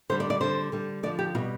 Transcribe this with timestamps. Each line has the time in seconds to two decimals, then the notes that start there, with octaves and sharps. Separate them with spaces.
0.09 D3 G3 C5
0.20 D5
0.30 D5
0.41 D3 G3 C5
0.72 D3 G3
1.03 D3 F3 D5
1.19 G4
1.35 B2 F4
1.38 G3